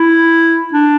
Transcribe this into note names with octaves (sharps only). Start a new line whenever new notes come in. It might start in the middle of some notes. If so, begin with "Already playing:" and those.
Already playing: E4
D4